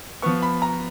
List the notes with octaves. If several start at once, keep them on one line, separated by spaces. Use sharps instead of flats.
F3 B3 C#6
B5
A#5